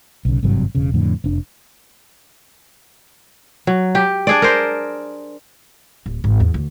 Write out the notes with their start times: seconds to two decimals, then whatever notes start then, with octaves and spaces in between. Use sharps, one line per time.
0.25 B1 C#3
0.43 G#1 G2 C3 F#3
0.75 E1 C#3
0.94 F2 A2 D3
1.24 F1 D4
3.67 F#3
3.95 G4
4.27 D4 G#4 D5
4.42 A#4 C5
6.06 D1
6.24 G#1
6.40 E2
6.54 D2